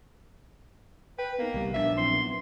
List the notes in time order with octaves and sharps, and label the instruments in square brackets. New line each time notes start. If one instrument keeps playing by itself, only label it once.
[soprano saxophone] B4 [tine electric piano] G5
[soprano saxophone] A#3 [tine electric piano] B3 D#4
[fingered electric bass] C2 G3
[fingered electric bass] A#1 E3 D4 [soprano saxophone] E5
[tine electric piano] F#3 C4 E4 [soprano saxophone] C6
[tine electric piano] B3